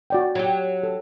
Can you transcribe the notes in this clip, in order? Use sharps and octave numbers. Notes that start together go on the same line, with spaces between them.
F#4 D5 G5
F#3 G4
A4